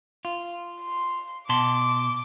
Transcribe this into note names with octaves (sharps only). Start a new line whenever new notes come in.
F4
C6
B2 A5 C6 D6